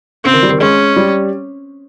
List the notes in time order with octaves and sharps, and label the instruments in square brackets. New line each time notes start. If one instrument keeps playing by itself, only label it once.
[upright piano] C#3 [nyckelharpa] C4
[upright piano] D#3
G3
D#3
[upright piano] G#3 [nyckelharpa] C#4
[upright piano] G3